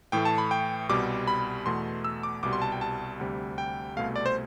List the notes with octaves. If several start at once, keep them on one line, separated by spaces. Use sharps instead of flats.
A2 E3 A3 G5
A5
B5
G5
C2 B2 G3 D6
B5
E2 B2 A3 C6
E6
D6
C2 B2 G3 D6
C6
A5
G5
A5
D2 C3 G3
G5
C2 B2 A3 F5
D5
C5